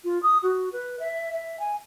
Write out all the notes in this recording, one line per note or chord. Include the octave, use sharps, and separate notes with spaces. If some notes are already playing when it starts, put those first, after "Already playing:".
F4
D#6
F#4
B4
E5
E5
G#5